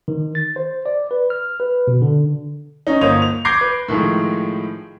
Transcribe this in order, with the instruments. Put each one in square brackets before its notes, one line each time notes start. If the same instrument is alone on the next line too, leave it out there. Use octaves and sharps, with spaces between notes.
[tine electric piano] D#3
A6
C5
D5
B4
F6
B4
B2
D3
[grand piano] C#4 D#4
G1 A#3 C5 C#5 D#6 F7
F7
D6 G6 G#6 A#6 C7 D7
B4
A2 D#3 F3 G#3